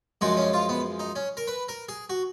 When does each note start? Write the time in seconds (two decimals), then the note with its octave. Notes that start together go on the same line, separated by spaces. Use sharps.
0.21 F#2 F3 G#3 F#4
0.37 C#4
0.53 F4
0.69 B3
0.99 D#4
1.15 C#4
1.37 A#4
1.47 B4
1.69 A#4
1.89 G#4
2.10 F#4